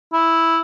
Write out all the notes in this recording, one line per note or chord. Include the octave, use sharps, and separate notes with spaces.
E4